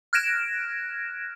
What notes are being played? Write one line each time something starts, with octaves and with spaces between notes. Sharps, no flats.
F6 F#6 G#6 A#6 D7 E7